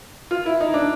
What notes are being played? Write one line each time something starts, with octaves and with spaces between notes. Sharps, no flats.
F4
E4
D#4
D4